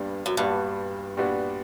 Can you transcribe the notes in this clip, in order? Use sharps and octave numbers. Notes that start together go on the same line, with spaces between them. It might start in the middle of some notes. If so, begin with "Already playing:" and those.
Already playing: G2 A#2 G3 B3 D4
F#2
G2 A#2 G3 B3 D4 F#4
A#2 G3 B3 D4 F#4